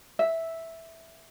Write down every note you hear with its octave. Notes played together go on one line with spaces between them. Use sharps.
E5